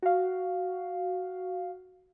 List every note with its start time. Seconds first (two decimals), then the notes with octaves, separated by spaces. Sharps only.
0.02 F#4 F5